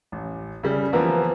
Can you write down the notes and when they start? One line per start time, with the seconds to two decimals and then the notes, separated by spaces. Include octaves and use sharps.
0.12 A1
0.63 C#3 G3
0.93 E3 F3 A#3 B3